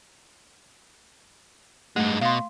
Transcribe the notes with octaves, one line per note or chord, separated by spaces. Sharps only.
G2 G#3 A3
B2 F5 C6